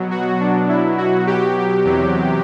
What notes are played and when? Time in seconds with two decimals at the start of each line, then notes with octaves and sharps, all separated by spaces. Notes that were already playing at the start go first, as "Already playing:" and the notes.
Already playing: B2 F#3
0.11 F#4
0.41 D4
0.69 E4
0.98 F#4
1.27 G4
1.85 E2 C3 F#3